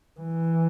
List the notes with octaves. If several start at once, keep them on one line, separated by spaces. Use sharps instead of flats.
E3